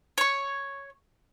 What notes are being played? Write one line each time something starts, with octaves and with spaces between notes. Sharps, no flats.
C#5 C#6